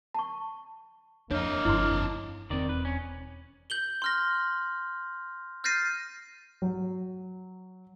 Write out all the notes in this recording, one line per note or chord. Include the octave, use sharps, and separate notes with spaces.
A5 C#6
F2 A#3 D4 C#5 D#5
G1 F2 E4 C6
E1 D#3 C4 D5
B4
C#4
G6 F#7 G7
C6 F6 A#6
F6 G6 A6 A#6 C7 D#7
F#3